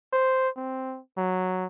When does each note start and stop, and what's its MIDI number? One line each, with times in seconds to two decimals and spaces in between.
0.13 0.49 72
0.56 0.99 60
1.17 1.66 54